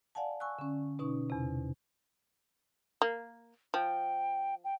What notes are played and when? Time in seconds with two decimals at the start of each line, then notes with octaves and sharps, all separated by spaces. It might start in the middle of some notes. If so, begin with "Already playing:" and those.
0.15 D5 F5 F#5 G#5 A5
0.40 G#5 C#6 E6 F#6
0.59 D3 C#4
0.99 B2 C#4 D#4 C#6
1.30 E2 C3
3.02 A#3
3.74 F3 G5
4.64 G5